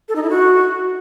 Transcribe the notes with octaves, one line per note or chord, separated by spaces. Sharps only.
A4
D#4
E4
F#4